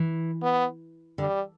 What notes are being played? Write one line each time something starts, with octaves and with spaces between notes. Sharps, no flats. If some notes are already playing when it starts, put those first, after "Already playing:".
Already playing: E3
B3
D3 G3